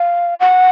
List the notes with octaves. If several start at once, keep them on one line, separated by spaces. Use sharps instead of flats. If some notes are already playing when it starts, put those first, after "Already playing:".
Already playing: F5
F#5